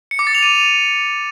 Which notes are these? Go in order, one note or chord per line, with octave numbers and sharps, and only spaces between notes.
C#7
D6
A6
F7
D#7